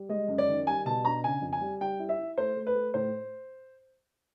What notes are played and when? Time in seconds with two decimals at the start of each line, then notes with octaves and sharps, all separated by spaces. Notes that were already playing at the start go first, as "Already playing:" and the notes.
Already playing: G3
0.09 G#3 D#5
0.28 F#2
0.38 D5
0.48 D#3
0.67 G3 G#5
0.85 B2 A5
1.04 D4 A#5
1.24 C#3 G#5
1.42 F2
1.53 G#5
1.61 G3
1.81 G3 G5
1.99 E4
2.09 E5
2.19 E4
2.38 A3 C5
2.57 A3
2.67 B4
2.75 A3
2.94 A2 C5